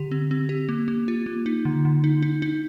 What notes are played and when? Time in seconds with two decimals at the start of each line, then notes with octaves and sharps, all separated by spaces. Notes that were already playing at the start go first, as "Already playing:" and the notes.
Already playing: D3 G4
0.11 C4
0.31 C4
0.49 G4
0.69 A#3
0.88 A#3
1.08 F4
1.26 A#3
1.46 D#4
1.65 D3
1.85 D3
2.04 D#4
2.22 D#4
2.42 D#4